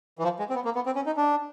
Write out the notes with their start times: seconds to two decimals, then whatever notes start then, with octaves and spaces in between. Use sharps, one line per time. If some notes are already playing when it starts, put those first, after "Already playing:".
0.19 E3
0.23 F3
0.39 G#3
0.50 C4
0.55 B3
0.65 A#3
0.75 B3
0.86 C4
0.96 C#4
1.06 D#4
1.17 D4